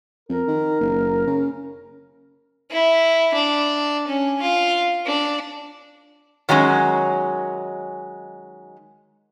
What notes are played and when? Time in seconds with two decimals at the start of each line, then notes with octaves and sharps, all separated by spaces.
0.29 F2 A#4
0.48 D#3
0.80 F#1
1.27 C#3
2.71 E4
3.34 D4
4.07 C#4
4.42 F4
5.06 D4
6.49 D#3 F#3 G#3 C#4